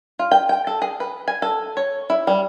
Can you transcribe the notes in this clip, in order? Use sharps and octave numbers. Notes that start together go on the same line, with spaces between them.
F4
G5
G5
A4
G#4
B4
G#5
A4
C#5
E4
G3